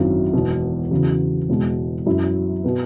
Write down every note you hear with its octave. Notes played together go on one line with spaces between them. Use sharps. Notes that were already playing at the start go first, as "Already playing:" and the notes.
Already playing: G#1 F#2 F#3 E4
E1 E2 B2
E2 C#3 F#3
E1 E2 B2 G#3
F#2 F#3 E4
B2 B3